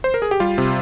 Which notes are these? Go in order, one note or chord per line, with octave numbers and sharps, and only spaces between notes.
C5
A#4
G#4
G4
G3 F4
C3